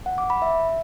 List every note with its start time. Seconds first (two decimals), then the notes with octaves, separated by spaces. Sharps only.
0.06 F#5
0.18 D6
0.30 B5
0.42 E5